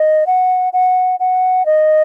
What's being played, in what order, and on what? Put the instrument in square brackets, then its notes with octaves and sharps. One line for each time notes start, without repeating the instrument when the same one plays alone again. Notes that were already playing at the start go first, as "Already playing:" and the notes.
Already playing: [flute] D#5
F#5
F#5
F#5
D#5